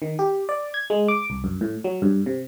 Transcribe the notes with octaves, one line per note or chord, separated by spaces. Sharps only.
D#3
G4
D5
G#6
G#3
D6
C2
F#2
A2
F#3
G2
C3